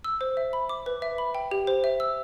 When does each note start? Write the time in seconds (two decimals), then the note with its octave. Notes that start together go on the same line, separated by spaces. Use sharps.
0.04 E6
0.21 C5
0.37 E5
0.53 B5
0.69 D6
0.86 B4
1.02 E5
1.18 B5
1.35 G5
1.51 G4
1.67 C5
1.84 E5
2.00 E6